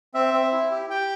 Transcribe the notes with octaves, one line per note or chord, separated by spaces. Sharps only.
C4 E5
C4
E4
G4
G4 G5